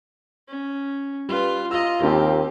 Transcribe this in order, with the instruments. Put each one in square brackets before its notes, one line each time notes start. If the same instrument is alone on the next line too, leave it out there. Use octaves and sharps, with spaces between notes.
[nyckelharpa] C#4
[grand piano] G3 B4 [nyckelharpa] F4
[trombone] F4 [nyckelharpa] D#5 A#5 [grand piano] E6
[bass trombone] D#2 [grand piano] A#3 C4 [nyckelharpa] G4